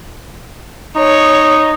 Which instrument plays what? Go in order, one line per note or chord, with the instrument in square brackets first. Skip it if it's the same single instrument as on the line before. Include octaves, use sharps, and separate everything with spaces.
[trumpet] D#4 [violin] C#5